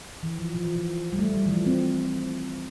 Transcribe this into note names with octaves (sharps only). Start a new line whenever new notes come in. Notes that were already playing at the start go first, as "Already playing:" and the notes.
E3
F3
F3
E3
F3
G3
A3
G3
E3
F3
C4